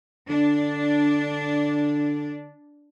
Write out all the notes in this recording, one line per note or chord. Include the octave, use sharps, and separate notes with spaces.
D3 D4